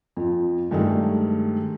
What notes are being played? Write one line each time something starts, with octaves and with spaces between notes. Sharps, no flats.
F2 F3
G2 D#3 G#3 A3